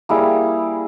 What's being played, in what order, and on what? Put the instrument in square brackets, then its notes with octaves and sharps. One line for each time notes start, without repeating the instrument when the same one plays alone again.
[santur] G3 A#3 E4 G#4